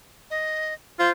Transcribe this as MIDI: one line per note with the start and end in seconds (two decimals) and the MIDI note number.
0.30 0.74 75
0.99 1.10 65
0.99 1.11 72